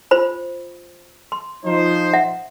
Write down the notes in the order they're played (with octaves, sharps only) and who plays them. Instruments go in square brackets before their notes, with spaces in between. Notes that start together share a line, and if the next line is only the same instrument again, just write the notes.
[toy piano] F4 C5 B5
C6
[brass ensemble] F3 D#4 C5
[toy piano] E5 F#5